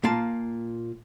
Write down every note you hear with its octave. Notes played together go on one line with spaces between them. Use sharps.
A#2 A#3 F4 A5